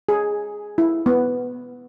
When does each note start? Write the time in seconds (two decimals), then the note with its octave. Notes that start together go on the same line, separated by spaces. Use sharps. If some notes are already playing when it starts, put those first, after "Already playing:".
0.09 G#4
0.78 E4
1.06 B3